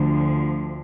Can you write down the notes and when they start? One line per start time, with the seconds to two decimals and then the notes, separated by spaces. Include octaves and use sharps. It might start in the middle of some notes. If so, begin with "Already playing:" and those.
Already playing: D2 D3 F3